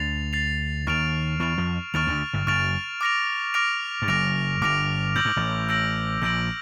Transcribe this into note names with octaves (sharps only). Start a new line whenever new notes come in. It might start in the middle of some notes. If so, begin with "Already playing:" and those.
Already playing: D2 D3 A6 C7 F7
A6 C7 F7
D#2 D#3 C#6 F6 A6 D7 F7
E2 E3 C#6 F6 A6 D7 F7
F2 F3
D#2 D#3 C#6 F6 A6 D7 F7
D2 D3
G1 G2
F#1 F#2 C#6 F6 A6 D7 F7
D6 F6 A#6 D7 F7
D6 F6 A#6 D7 F7
G2
F#1 F#2 D6 F6 A#6 D7 F7
G1 G2 D6 F6 A#6 D7 F7
A2 E6 G6 A#6 D7 F#7
G#2
A1 A2
E6 G6 A#6 D7 F#7
A#1 A#2 E6 G6 A#6 D7 F#7